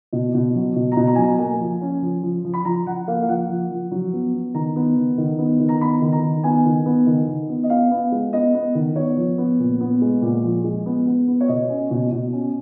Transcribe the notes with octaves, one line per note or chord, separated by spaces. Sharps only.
B2
B2
F#3
B2
B2 A#5
A#5
F#3 G#5
A#5
A#3 G#5
F3
C#4
F3
F3
F3
B5
F3 A#5
F3 F#5
A#3 F5
F5
F3 F#5
F3
F3
F#3
B3
B3
D#3 A#5
B3
D#3
D#3
B3
D#3
A#5
B3 B5
D#3
A#5
D#3
B3 G#5
D#3
B3
D#3
D#3
B3
D#5
B3 F5
B3
G#3
B3 D#5
B3
D#3
B3 C#5
F3
B3
A#2
B3
G#3
A#2
F3
G#3
B3
B3
B3
C#5
B2 D#5
C#4
B2
B2
C#4